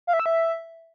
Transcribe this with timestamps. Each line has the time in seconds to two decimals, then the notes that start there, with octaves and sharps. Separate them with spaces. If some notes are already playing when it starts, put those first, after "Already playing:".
0.07 F5
0.13 E5
0.20 E6
0.26 E5